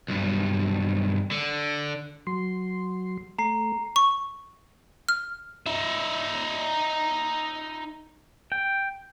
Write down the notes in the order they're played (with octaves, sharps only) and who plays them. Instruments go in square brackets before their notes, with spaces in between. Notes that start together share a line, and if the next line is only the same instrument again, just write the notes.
[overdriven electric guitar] B1 G2
D3
[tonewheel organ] F#3 C6
[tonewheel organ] A3 [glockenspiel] A#5 C7
[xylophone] C#6
F6
[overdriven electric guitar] D#4 E5
[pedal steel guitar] G5